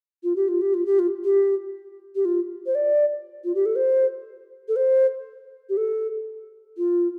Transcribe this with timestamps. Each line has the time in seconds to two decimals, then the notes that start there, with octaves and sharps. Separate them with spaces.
0.24 F4
0.36 G4
0.48 F4
0.61 G4
0.74 F4
0.86 G4
0.99 F4
1.24 G4
2.16 G4
2.25 F4
2.66 C5
2.75 D5
3.45 F4
3.55 G4
3.66 A4
3.76 C5
4.68 A4
4.76 C5
5.69 G4
5.77 A4
6.77 F4